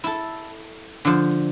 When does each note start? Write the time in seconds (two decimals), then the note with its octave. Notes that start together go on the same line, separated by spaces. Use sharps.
0.04 E4 A4
1.05 D3 F3